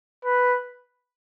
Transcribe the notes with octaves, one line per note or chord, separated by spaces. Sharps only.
B4